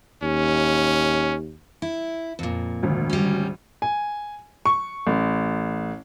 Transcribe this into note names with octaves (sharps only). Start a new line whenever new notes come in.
D#2 C#4
E4
F2 A#2
G#1 D2
G3 C#4
G#5
C#6
A1